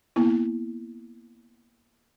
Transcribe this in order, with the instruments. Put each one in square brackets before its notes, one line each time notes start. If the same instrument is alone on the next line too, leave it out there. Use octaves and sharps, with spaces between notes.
[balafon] A#3 B3 E4